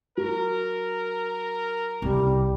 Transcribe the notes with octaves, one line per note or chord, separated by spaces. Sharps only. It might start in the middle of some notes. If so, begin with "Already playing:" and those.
F#3 A#4
C2 C#3 G3